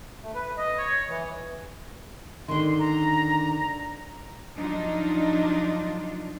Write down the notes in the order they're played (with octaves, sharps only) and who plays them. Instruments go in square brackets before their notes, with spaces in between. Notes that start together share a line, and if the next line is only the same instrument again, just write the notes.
[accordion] A3
B4
D#5
C#5
E3
[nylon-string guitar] D3 D#3 [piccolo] C6
[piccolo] A#5
[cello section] F3 F#3 D4 D#4 F4